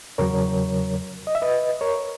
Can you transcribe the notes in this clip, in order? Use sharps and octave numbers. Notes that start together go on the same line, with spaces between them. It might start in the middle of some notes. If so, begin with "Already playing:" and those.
E2 C#3 F#3 A#4 C#5
D#5
E5
B4 D#5
A#4 C#5